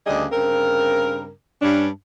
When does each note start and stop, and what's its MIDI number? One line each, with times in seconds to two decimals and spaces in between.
0.07 0.25 38
0.07 0.25 49
0.07 0.25 55
0.07 0.25 62
0.07 0.25 68
0.07 0.25 75
0.32 1.31 43
0.32 1.31 49
0.32 1.31 60
0.32 1.31 70
1.62 1.88 43
1.62 1.88 61
1.62 1.88 62